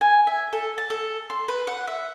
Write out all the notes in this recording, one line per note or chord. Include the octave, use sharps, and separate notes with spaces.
G#5
E5
A4
A5
A4
C6
B4
F#5
E5